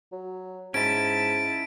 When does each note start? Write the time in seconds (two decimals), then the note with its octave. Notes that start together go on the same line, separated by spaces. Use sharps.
0.12 F#3
0.74 G#2 C#4 E4 A5 D7